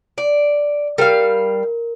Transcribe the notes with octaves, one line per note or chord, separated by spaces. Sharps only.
D5
G3 A#4 F5